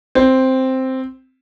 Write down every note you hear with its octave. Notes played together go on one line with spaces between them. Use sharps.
C4